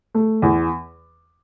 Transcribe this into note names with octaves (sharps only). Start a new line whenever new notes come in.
A3
E2